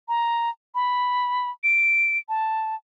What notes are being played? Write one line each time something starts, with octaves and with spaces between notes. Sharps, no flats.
A#5
B5
D7
A5